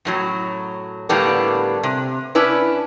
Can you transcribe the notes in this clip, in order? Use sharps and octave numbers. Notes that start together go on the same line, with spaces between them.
F#2 A2 F#3
A2 D3 G3 A#3 B3 D4
C3
C#4 D4 E4 B4